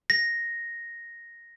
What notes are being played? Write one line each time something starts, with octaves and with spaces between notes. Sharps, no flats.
A#6